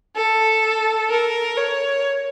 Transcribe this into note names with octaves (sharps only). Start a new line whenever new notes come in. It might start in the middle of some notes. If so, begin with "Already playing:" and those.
A4
A#4
C#5